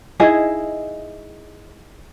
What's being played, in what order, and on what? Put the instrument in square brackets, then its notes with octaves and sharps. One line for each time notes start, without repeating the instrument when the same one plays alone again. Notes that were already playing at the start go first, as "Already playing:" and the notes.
[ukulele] D#4 E4 G#4 D#5